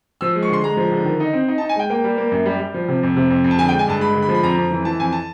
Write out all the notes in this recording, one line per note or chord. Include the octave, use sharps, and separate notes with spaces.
F3 E6
G#3
C#6
D3 C6
G#3 A#5
F3
D3
D#3
D#4
C4
D#4
A5
D#4
G#5
G#3 G5
A#3 G5
G3
A#3
F#2
G3
G3
F3
C3
F2
C3
F2
F2
A5
D3 G#5
G5
G#3
G#5
G2 A5
G#3 B5
D3
B5
F3
B5
F2 A#5
F2
E3
E3 A5
F2 G#5
A5